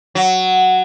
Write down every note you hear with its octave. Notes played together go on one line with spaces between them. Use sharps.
F#3